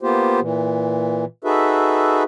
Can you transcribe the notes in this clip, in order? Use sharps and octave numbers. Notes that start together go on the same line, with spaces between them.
A#3 B3 F4 G4 C5
A#2 E3
D#4 F#4 G#4 A4 B4 E5